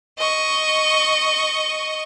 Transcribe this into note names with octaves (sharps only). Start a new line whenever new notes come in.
D#5 C#6